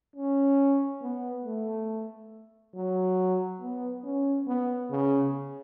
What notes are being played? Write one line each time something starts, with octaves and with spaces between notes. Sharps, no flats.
C#4
B3
A3
F#3
B3
C#4
B3
C#3